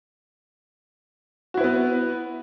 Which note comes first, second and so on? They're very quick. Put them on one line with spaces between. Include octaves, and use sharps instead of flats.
F#4 E4 B4 B3